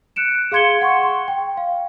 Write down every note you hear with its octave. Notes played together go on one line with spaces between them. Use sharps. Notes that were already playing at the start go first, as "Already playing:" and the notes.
F#6 C#7 D7 E7
G#4 F5 C6 G#6 C#7 G7
F#5 C6 C#6
C6
G5
F5